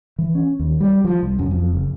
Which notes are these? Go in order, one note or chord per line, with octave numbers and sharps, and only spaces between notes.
E3
C#4
D#2
G3
F3
C2
F#2
F2
F#1